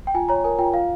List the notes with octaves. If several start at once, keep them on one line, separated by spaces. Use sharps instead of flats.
G5
F4 G#5
C#5 A#5
A#4 G#5
F4 G5
F4 F5